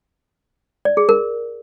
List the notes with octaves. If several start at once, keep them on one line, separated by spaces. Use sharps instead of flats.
D5
G#4
A#4